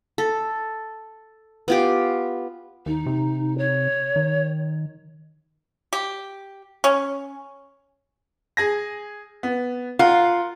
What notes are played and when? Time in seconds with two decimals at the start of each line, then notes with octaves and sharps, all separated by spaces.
0.18 A4
1.68 B3 F4 G4
2.86 D#2 D#4
3.06 C3
3.57 C#5
4.16 D#3
5.93 G4
6.84 C#4
8.57 G#4 G#5 A#6
9.43 B3
9.99 F4 A#4 F5 F#5